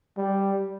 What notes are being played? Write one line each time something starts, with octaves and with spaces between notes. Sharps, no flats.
G3